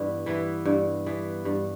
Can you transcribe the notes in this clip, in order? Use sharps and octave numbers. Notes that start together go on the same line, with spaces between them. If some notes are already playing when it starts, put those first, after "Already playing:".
Already playing: G2 E3 B3 E4
E3 B3 E4
G2
E3 B3
G2